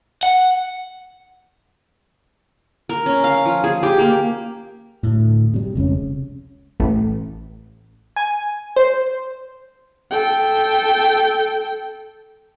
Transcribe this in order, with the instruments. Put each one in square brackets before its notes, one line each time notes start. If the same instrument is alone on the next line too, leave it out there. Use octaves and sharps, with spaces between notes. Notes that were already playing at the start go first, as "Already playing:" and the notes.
[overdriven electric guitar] F#5
[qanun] A#4
C#4
F5
F3
G#4
G4
A#3
[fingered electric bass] D2 A2
C3 F#3 G3
F1 C#2 C#3 C#4
[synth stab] A1
G#5
C5
[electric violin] A4 G5